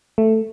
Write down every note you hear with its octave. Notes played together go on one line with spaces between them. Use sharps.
A3